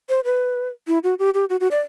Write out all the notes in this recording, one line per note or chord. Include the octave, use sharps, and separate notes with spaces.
C5
B4
E4
F#4
G4
G4
F#4
F#4
D5